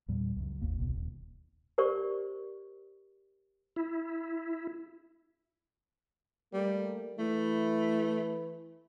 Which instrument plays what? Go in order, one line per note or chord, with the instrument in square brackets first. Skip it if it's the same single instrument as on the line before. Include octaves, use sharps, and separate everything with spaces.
[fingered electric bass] E2 A#2 G3
C#2 F#2
G1 D#2 A#3
D#1 B1 B2
D#1
[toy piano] G4 A#4 C5 D5 C#6
[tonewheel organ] E4
[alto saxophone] G3 [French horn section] A3 A#3 A#4
[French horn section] E3 E4 B4 [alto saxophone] A3